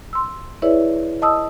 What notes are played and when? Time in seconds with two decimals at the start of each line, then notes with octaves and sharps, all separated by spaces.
0.13 C6 E6
0.62 E4 G#4 B4 C#5 D5 E5
1.22 D#5 A5 D#6 E6